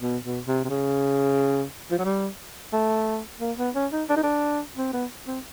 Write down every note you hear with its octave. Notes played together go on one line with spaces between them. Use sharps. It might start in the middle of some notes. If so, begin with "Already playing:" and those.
B2
B2
C3
C3
C#3
F3
F#3
G3
A3
A#3
B3
C#4
D#4
D4
D#4
D4
C4
B3
C4